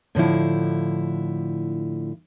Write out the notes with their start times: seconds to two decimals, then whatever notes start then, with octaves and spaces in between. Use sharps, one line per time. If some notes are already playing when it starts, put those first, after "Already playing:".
0.15 A2 D3 F3 E4